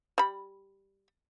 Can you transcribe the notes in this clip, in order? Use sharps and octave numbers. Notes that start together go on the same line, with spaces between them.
G3 B5